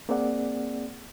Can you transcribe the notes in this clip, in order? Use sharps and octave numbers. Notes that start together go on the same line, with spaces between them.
A#3 C4 G#4 D5 F#5